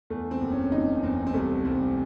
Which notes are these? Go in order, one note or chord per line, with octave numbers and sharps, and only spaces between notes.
E2 A3
C4
F#1
C#4
F#1 D#4
E2 C4
C4
C2 A3
C2 C4